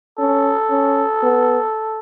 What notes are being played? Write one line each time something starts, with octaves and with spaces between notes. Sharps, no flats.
C#4 A4
C#4
B3